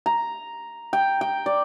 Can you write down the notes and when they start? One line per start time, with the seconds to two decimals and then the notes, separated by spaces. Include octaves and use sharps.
0.06 A#5
0.93 G5
1.21 G5
1.46 D5